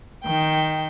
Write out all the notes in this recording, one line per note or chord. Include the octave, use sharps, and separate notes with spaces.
D#3 G5